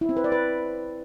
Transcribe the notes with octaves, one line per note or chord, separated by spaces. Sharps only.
E4
C4
B4
D5
B4